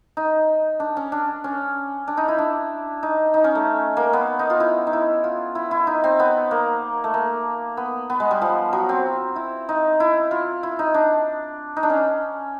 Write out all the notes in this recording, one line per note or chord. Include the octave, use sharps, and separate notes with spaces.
D#4
D4
C#4
D4
C#4
D4
D#4
E4
D4
D#4
D#4
C#4
A3
A#3
B3
D#4
F4
E4
D#4
E4
F4
E4
E4
D#4
C4
B3
A#3
A3
A#3
B3
B3
G#3
G3
F3
F#3
C4
E4
D#4
E4
F4
E4
D#4
D4
D#4
D4
C#4